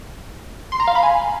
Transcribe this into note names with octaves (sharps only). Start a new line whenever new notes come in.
C6
A#5
F5
B5
G#5